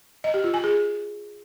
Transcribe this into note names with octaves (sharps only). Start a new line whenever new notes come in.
D#5
G4
F4
G#5
G#4